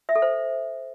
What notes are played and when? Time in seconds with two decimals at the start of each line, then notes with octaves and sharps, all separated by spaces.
0.09 E5
0.16 A4
0.22 C5